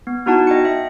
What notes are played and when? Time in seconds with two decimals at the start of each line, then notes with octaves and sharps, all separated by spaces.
0.07 B3
0.26 B3 D#4 E4 F#4 F#5 A5
0.47 D#5 G5 C#7
0.65 E5